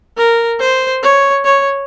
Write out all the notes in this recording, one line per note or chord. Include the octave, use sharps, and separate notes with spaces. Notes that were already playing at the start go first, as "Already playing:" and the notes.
A#4
C5
C#5
C#5